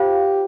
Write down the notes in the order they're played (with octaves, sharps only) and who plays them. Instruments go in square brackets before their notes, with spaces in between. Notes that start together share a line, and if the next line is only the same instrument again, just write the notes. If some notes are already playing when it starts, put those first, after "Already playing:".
Already playing: [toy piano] F4 C5 F5 [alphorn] G4